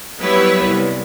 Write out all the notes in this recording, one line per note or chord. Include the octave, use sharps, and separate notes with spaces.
F#3 G3 B3 E4 B4 C#5
C2